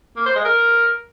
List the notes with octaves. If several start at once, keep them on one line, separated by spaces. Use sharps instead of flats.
A#3
C5
G#3
A#4